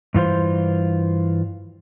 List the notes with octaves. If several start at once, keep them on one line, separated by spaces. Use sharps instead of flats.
G2 E3 F4 C5